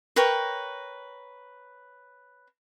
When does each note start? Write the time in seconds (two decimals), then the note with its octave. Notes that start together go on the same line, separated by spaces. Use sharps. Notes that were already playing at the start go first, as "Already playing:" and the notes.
0.16 A#4 B4 C#5 G5